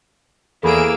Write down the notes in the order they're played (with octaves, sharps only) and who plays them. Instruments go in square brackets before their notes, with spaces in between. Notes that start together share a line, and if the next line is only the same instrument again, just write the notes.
[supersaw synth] E2 G#4 D7 [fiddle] A#3 E6 [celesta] A4 B5